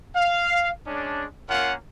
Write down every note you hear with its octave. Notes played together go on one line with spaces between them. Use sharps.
F5
G#3 C#4 D4
A#3 C#4 F4 A#4 F#5